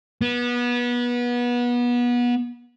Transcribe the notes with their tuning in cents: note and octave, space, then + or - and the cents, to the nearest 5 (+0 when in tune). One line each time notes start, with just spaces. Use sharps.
B3 -25